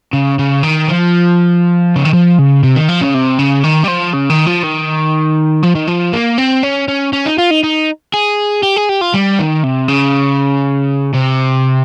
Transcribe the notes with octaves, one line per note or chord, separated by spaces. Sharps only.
C#3
C#3
D#3
F3
C#3
D#3
F3
C#3
C3
D#3
F3
C#3
C3
C#3
D#3
G3
F3
C#3
D#3
F3
D#3
F3
D#3
F3
A#3
C4
C#4
C#4
C#4
D#4
F4
D#4
D#4
G#4
G4
G#4
G4
F4
G3
D#3
C3
C#3
C3